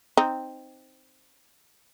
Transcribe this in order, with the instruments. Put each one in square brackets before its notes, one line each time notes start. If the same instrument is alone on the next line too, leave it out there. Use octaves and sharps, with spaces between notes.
[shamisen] C4 D#4